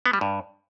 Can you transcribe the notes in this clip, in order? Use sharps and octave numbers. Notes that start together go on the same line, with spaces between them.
B3
G3
G2